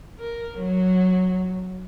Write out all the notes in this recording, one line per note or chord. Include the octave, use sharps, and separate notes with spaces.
A#4
F#3